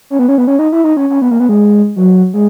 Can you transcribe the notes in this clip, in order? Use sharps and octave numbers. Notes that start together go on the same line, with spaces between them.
C#4
B3
C#4
B3
C#4
D#4
E4
D#4
C#4
C#4
B3
A#3
B3
G#3
F#3
G#3